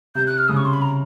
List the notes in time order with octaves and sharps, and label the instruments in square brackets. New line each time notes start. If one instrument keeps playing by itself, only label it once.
[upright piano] C3 [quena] G6
[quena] F#6
F6
[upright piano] C#3 [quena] D#6
[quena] C#6
C6
B5
A#5